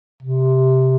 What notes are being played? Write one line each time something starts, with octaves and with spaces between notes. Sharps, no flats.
C3